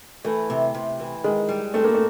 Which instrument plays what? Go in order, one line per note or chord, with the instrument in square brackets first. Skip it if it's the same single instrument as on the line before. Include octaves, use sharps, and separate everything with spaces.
[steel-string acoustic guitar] E3 [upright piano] A3
[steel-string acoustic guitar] C3
C3
E3
[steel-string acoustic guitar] D#3 [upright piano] G#3
[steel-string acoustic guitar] G3
[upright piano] A3 [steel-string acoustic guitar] C4
[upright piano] A#3
A3